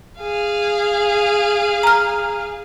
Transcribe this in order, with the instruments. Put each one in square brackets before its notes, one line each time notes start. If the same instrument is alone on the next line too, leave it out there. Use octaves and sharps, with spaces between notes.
[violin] G#4 F5
[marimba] A#5 F6